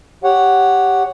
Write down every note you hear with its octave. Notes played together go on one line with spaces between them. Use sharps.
G4 C#5 F#5